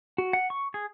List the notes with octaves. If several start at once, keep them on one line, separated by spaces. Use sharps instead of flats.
F#4
F#5
C#6
G#4